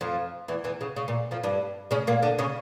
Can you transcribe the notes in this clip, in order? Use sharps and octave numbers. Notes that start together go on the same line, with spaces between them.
F2 F3
E2 E3
E2 E3
C#3
C#3
A#2
F2 F3
G2 G3
C#3 C#4
A#2 A#3
D3 D4
C#3 C#4